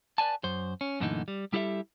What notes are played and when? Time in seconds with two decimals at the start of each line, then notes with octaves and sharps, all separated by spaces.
0.18 B4 D5 G#5 A5
0.44 F#2 C5
0.81 C#4
1.00 F#2 A#2 D3 E3 A3 D#4
1.28 G3
1.53 G3 E4 G4 A4 D5 E5